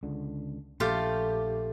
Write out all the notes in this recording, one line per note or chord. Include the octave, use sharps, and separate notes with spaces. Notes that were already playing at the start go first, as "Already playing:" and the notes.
C#2 D3
A#1 A3 F4 G4